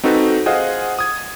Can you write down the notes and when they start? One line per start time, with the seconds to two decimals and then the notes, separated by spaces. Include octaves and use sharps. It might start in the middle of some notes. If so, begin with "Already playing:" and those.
0.04 C4 D#4 F#4 A4 B4
0.46 F4 G#4 C5 D#5 F5 F#5
0.99 D#6 G#6